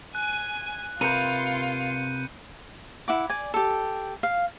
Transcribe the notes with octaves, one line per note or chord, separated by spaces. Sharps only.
G#5 F#6 D#7
C3 F4 A#4 B4 G6 C#7 D#7
E4 F#5 D6
D5 G#5
G4 A4
F5